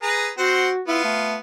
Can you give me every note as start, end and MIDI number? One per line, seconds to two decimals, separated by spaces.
0.02 0.29 68
0.02 0.29 71
0.02 0.29 82
0.38 0.69 60
0.38 0.81 66
0.38 0.69 72
0.38 0.69 78
0.88 1.39 59
0.88 0.99 64
0.88 1.39 65
1.04 1.36 57